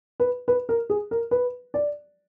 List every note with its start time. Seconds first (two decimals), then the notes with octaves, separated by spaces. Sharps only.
0.20 B4
0.48 B4
0.69 A#4
0.90 G#4
1.11 A#4
1.31 B4
1.74 D5